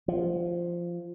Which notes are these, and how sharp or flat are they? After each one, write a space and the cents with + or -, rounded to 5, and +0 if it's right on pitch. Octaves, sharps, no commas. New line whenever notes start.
F3 -10